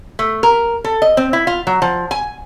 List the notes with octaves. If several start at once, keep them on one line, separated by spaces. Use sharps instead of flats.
A3
A#4
A4
D#5
C4
E4
F4
F#3
F3
G#5